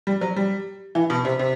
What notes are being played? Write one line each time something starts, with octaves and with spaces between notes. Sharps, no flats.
G3
F#3
G3
E3
B2
C3
C3